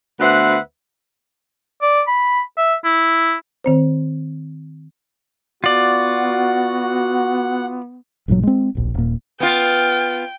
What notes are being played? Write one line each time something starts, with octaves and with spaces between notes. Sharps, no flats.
D2 B3 B4 C5 E5 F#5
D5
B5
E5
E4
D#3 C4 C5
B3 F4 F#4 D5 F#5
A1 G2 A#2 F#3
G#3 C4
D1 A#1
D#1 A#2
B3 F4 G5